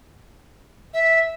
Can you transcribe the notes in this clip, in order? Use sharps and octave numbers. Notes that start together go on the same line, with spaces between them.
E5